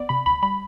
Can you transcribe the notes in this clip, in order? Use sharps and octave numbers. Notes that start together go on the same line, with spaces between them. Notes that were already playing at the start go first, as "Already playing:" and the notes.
Already playing: B3 D5
C3 B5
D2 B5
G3 B5